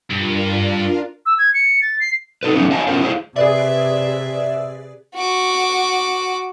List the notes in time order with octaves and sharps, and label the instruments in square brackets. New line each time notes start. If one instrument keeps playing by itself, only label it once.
[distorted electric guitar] G2 [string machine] D4 F4 A#4
[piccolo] E6
G#6
C#7
A6
C7
[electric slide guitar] D#4 A4 B4
E3 F#3 A3 B3 C#4 D#4
C5 C#5 D#5 F5 G#5 A5
B3 C#4 F4 A#4 C5
E4 G#4 A4 C5 F5
[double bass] C3 [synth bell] G#4 B4 D5 [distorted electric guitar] E5
[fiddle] F#4 D6